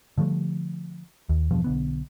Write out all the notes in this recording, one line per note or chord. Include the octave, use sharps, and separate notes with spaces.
D3 F3 G3 A3
D#2
E2 G2 B2 F3
B1 D3 B3